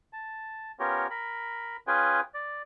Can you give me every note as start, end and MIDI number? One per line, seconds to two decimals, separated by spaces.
0.13 0.72 81
0.79 1.07 59
0.79 1.07 61
0.79 1.07 65
0.79 1.07 67
0.79 1.07 70
0.79 1.07 73
1.10 1.77 70
1.10 1.77 83
1.87 2.20 61
1.87 2.20 65
1.87 2.20 68
1.87 2.20 71
1.87 2.20 79
1.87 2.20 80
2.34 2.62 74